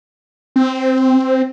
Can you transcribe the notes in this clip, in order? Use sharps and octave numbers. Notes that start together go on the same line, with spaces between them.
C4